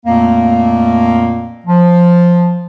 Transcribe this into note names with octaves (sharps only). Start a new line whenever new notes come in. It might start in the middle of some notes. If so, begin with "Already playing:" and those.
F2 A#2 A3 A#3
F3